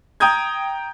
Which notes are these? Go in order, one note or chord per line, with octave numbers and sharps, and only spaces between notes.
G5 A#5 D#6 G6 G#6